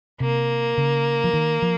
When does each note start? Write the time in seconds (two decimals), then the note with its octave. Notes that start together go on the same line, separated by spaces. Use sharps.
0.20 C3 A#3
0.78 C#3
1.24 F3
1.33 D#3
1.62 F3